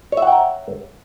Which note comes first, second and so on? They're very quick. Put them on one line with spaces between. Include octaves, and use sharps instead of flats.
C#5 E5 F#5 G5 A#5